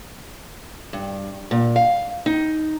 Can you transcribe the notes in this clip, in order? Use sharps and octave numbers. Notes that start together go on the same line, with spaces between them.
G2
A#2
F5
D#4